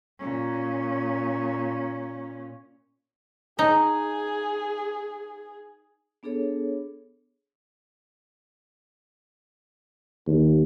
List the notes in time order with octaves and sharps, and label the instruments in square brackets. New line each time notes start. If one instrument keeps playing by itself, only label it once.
[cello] A#2 C#4
[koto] D#4 [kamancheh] G#4
[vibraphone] B3 D4 G#4 A4 C#5
[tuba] D#2